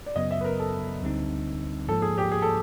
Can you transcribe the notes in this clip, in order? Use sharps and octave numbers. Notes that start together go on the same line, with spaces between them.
D5
F#2 C#3 F#3 B3 D#5
E5
B4
A#4
A4
D2 D3 G3 C4 D#4
G#2 F3 A#3 A4
G#4
G4
G#4
A4